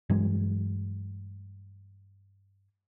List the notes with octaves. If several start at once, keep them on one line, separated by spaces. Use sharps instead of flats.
G2 E3 F#3 G#3